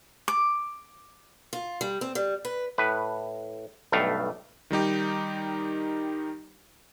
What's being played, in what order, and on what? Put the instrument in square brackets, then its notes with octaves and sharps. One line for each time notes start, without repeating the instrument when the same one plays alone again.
[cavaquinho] D6
[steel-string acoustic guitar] F4
G3
C4
G3
B4
[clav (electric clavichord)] A2 B4
B1 G2 A3 F5
[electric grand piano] D#3 G3 D#4 G4